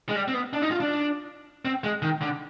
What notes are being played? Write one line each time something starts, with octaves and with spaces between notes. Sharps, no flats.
G#3
G3
C4
B3
D4
D#4
F4
D4
C4
G#3
D#3
D3